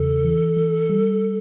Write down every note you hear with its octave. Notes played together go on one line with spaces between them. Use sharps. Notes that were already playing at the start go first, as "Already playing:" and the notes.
Already playing: E2 C#3 A4
E3
E3
G3